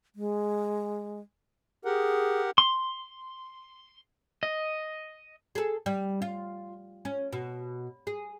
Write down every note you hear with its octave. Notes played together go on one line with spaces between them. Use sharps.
G#3
G4 G#4 A#4 F#5
C6
D#5
G#4 A4
G3
F4
C#4
B2
G#4